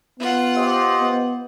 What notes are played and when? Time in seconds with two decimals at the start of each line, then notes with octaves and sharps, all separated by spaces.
0.20 B3 F4 F#5
0.56 G4 C5 D#5
1.00 B3